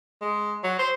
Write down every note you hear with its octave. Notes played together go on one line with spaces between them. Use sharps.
G#3
F#3
C5